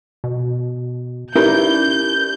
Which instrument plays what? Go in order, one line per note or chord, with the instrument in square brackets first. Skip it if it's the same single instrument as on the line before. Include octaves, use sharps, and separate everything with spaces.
[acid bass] B2
[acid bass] C#4 [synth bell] D#4 G4 D5 [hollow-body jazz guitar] E4 A#4 B4 [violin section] G6